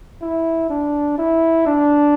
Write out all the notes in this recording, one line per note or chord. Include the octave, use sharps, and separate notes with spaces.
E4
D4
E4
D4